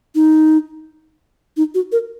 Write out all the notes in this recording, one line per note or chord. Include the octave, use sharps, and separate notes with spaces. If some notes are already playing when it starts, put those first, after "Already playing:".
D#4
D#4
F#4
A#4